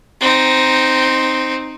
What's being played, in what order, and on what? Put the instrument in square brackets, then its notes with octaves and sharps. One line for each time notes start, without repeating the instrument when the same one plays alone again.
[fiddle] C4 D#4